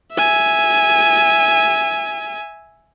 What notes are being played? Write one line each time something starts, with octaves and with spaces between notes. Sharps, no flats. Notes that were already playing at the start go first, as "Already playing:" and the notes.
E5 G#5